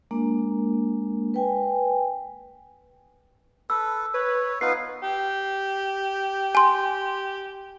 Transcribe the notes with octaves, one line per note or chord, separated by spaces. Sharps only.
G#3 A#3 D4 A#4
B4 G5 G#5
A4 B4 E6
B4 C#5
B3 D#4 F4 B4 C7
G4
G#5 C6